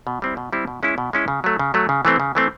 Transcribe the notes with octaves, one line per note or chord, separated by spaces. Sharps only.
B2
G3 C4 E4
B2
G3 C4 E4
B2
G#3 C#4 E4
B2
G#3 C#4 E4
C#3
F#3 A3
C#3
F#3 A3
C#3
E3 A3 C4
C#3
E3 A3 C4